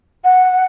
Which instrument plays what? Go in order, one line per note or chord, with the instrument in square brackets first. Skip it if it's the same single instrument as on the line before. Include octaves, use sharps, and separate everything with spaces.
[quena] F#5